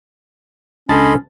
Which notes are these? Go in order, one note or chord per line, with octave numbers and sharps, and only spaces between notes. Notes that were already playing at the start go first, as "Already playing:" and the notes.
C#2 C#4 D4 A4 D#5 A5 B5 C6